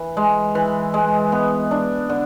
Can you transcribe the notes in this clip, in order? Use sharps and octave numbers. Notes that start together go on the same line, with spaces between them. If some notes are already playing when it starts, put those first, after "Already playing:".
Already playing: E3
G#3
E3
G#3
B3
D4
D3